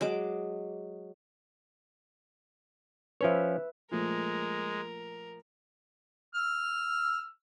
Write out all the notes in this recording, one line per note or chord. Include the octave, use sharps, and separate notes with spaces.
F#3 G#3 D6
F3 C#4 B4 C#5 E5
A#2 F3 G#3 A3 A#4
E6 F6